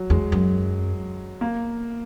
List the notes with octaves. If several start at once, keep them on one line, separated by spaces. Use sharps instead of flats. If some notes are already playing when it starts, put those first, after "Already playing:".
Already playing: F#3
E2 G#3
F#2
A#3